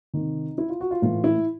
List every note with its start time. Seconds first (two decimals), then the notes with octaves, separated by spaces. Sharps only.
0.13 C3 D#3 D#4
0.58 E4
0.70 F4
0.81 F#4
0.91 F4
1.02 A2 E3 F4
1.24 E4